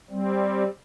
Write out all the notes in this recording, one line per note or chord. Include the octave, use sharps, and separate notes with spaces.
G3 C4